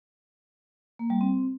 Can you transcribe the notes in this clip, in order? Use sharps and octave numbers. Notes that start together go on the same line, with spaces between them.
A#3
G3
C4